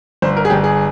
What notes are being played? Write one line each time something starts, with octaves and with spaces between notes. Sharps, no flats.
G1 C5
A#4
G#4
G1 G4
G#4